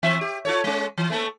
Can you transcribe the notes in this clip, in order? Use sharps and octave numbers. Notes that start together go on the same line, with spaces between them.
E3 C4 E5
G4
F4 A4 C#5
G#3 C#4
E3
A3 A#3 A4